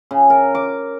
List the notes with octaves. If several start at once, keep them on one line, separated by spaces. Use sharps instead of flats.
C#3
A#4
D6